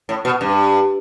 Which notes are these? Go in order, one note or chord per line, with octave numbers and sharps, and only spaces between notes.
A2
B2
G2